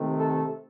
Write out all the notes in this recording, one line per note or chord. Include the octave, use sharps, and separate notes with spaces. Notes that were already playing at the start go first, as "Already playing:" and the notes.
Already playing: C3 D#3 A3
A4